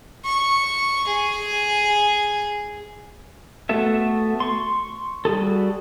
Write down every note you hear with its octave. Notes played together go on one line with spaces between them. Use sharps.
C#6
G#4
A3 B3 F#4 A4 E5
C6 C#6
G3 F#4 G#4 A4